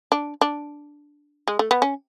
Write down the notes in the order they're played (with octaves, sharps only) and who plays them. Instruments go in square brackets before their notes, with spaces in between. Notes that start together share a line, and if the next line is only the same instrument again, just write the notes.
[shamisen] D4
D4
G#3
A3
B3
C#4